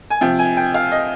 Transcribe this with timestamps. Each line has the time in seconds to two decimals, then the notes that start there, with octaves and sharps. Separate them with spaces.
0.10 G#5
0.21 C3 F3 G5
0.39 G#5
0.57 G5
0.74 F5
0.92 D#5